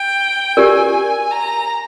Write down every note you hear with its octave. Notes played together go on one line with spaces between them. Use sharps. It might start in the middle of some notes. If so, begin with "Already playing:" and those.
Already playing: G5
G4 A#4 D5 G#5
A#5